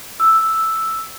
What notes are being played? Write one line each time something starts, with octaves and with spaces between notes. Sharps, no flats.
E6